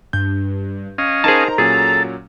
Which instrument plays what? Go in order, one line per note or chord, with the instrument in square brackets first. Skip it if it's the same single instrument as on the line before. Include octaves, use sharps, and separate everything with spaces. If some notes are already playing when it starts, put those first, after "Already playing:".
[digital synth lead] G2 [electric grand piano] G6
[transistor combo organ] C#4 D#5 F5
[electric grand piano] D#4 A#4 C5 [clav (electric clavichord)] G#4 A5 [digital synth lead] A#5
[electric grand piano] A#2 F#3 C#4 [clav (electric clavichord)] G#4 [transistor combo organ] A4